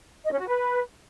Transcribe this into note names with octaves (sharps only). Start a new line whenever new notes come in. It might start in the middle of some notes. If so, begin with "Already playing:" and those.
D#5
C#4
F#4
B4